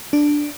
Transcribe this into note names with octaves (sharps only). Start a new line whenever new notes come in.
D4